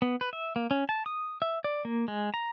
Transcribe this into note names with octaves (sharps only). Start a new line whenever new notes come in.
B3
B4
E5
A#3
C#4
A5
D#6
E5
D5
A#3
G#3
A#5